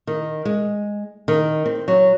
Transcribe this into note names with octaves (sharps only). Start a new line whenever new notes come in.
D#3
G#3
D#3
C4
F#3